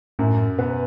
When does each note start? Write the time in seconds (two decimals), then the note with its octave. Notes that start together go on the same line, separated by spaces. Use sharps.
0.19 F#2 A2
0.59 B2 B3